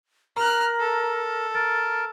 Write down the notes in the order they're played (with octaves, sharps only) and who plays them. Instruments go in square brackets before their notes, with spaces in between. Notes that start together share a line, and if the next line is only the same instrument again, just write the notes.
[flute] A#4 [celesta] A#5 [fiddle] F6 F#6
[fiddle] A4
[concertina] A#4 [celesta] A6